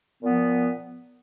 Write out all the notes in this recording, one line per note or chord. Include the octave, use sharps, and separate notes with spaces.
A#2 F3 B3